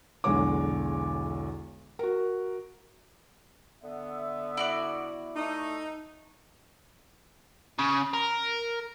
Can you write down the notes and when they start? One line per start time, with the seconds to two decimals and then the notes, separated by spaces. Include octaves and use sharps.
0.24 B1 E2 D3 G#3 C#5 D6
1.99 F#4 A#4
3.83 D3 B3 E5
4.57 E4 F#4 D5
5.36 A3 D#4
7.79 C#3
8.13 A#4